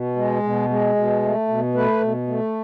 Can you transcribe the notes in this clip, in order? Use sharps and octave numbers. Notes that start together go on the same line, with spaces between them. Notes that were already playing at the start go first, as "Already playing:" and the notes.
Already playing: B2
G#3
B2
G#3
B2
A3
B2
A3 B4
B2
A3